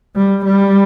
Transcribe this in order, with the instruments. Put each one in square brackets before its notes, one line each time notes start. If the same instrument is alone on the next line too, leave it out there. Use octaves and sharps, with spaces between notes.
[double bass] G3
G3